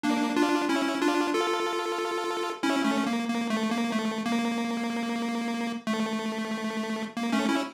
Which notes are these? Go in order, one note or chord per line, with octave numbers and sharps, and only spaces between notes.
A#3 D4
D4 F4
C#4 E4
D4 F4
F4 A4
C#4 E4
A3 C#4
A#3
A#3
A3
A#3
A3
A#3
A3
A#3
A3 C#4
C#4 E4